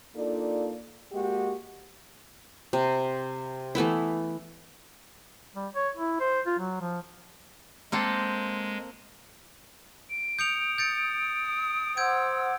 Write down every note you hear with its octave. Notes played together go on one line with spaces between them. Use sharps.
A#3 D4 D#4 F4 A4 D5
G#3 A#3 F#4 G4
C3
E3 A3 B3 E4
G3
C#5
E4
C5
F4
F#3
F3
G#3 A#3 C4 A4
D7
D#6 G6 C#7 F7
G6 A6 C#7
C5 F#5 E6 G6 G#6 D7